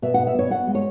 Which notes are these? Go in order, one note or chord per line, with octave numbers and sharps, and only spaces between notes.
B2 E5
B2 F#5
E5
B3 C#5
B3 F#5
G#3
C#5